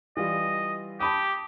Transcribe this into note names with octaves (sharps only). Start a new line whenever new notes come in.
E3 G3 F4 D#5
G4 A5 B5 D#6